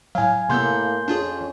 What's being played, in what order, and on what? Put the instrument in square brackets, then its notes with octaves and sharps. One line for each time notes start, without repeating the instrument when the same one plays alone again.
[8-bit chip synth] A2 F#3 [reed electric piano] F5 G#5
[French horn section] A2 A#3 [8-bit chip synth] C3 B3 E6 [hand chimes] C6 G6
[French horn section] F2 C#4 [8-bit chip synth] D4 F4 G#4